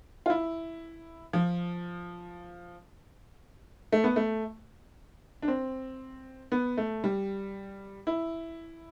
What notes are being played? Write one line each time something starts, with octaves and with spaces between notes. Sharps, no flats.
F4
E4
F3
A3
B3
A3
D4
C4
B3
A3
G3
E4